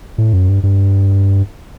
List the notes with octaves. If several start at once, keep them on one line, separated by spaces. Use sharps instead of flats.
A2
F#2
G2
G2